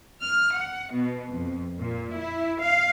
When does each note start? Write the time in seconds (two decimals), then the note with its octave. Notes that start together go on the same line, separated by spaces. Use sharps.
0.23 F6
0.57 F#5
0.92 B2
1.29 F2
1.78 A#2
2.14 E4
2.60 F5